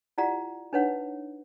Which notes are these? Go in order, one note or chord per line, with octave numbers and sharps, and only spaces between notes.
E4 F4 G4 D5 F#5 A#5
D4 D#4 B4 C#5 F#5